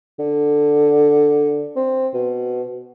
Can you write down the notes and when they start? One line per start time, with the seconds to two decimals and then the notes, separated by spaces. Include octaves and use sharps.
0.19 D3
1.76 C4
2.14 B2